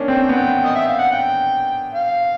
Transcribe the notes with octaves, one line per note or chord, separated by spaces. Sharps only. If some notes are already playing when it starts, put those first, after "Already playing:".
Already playing: A#3 C#4 D4
C4 G5
B3
D#5
E5
F5
F#5
G5
F5